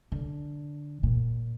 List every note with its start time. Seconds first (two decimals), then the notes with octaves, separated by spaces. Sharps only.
0.12 D3
1.03 A#2